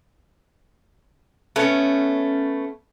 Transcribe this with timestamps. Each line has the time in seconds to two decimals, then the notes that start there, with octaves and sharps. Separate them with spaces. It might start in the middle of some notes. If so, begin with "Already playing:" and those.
1.56 A3 B3 C#4